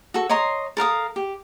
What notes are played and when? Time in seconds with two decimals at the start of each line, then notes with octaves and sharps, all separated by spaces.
0.14 F#4 A4
0.29 C#5 D#5 A#5 C6
0.77 A4 A#4 F5 D#6
1.16 G4